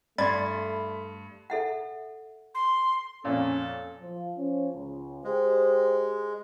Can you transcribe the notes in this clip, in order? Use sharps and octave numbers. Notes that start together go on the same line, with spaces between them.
G2 A3 D5 B5 C6 G#6 A6
A4 E5 F#5
C6
F2 A#2 C#4 A4
F3
F3 C#4
C#2
G#3 G4 C5